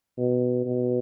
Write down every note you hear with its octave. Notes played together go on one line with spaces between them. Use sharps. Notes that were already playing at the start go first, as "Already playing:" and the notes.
B2
B2